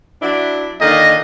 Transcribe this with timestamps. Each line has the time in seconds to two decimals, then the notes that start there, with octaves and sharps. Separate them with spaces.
0.22 F#3 D4 E4
0.81 A#2 D3 D#3 D#5